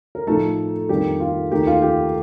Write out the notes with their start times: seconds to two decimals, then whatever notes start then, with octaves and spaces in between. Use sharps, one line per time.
0.15 A#4
0.27 A2 F3 A3 D#4 A4
0.89 F2 D#3 G3 A#3 D4 G4
1.20 F4
1.51 D#2 D#3 A3 D#4 G4
1.67 F4
1.82 G4